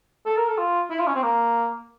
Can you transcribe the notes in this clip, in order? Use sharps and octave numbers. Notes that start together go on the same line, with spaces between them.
A4
A#4
A4
F4
E4
F4
C#4
C4
A#3